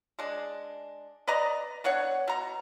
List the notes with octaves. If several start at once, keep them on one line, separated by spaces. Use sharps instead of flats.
G#3 D4
B4 D5 D#5 A#5
B3 D4 C#5 F#5
B2 A#5